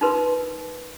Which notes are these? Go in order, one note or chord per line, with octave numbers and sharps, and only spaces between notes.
D#4 F4 A#4 B4 C6